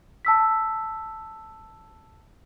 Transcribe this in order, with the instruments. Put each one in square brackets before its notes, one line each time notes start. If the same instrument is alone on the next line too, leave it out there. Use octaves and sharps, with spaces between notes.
[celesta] A5 E6 B6